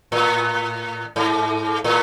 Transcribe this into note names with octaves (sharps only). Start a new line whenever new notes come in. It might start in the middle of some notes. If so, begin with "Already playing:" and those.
A2
G#2
A2